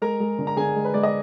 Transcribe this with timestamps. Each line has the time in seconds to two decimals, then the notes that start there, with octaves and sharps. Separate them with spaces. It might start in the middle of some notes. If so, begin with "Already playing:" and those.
0.02 G#3 A#4 A#5
0.20 G#3
0.39 D3
0.47 A#5
0.57 D3 G#4 G#5
0.76 G#3
0.85 B4
0.94 G#3 D5
1.03 D#5